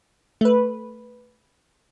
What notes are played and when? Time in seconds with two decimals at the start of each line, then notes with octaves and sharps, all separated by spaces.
0.41 A3 B4